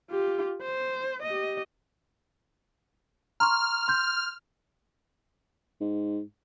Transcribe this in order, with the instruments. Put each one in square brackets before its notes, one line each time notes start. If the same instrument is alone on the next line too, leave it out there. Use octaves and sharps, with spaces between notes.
[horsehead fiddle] F4 G4
C5
G4 D#5
[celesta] A#5 C6 C#6 [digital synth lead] F6
[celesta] C6 G6
[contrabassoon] G#2